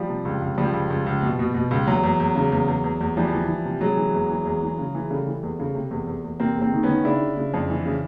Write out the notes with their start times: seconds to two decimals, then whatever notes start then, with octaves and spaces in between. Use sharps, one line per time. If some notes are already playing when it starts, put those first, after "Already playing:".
Already playing: F3 G3
0.09 C3
0.25 C#2
0.42 C#2
0.58 C#2 F3 G3
0.74 C#2
0.90 C#2
1.06 C#2
1.22 B2
1.39 B2
1.54 B2
1.71 C#2
1.87 E2 F#3
2.03 E2
2.20 E2
2.35 C#3
2.52 E2
2.68 E2
2.84 E2
3.01 E2
3.17 E3 F3 G3
3.33 E3
3.48 E3
3.65 C3
3.81 C3 F#3 G#3
3.97 E3
4.14 E2
4.30 E3
4.45 E2
4.63 E3
4.79 C#3
4.95 E3
5.10 C#3 G3 A3
5.27 E3
5.43 E2
5.60 C#3
5.75 C3
5.91 E2
6.07 E2
6.24 E2
6.40 C3 A#3 C4
6.56 E2
6.61 A#3 C4
6.73 D#3
6.83 B3 C#4
6.89 D#3
7.04 C#3 D4 E4
7.20 C#3
7.37 C#3
7.54 F2
7.70 E3
7.86 C#3